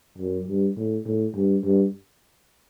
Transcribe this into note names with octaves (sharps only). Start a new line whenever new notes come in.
F#2
G2
A2
A2
G2
G2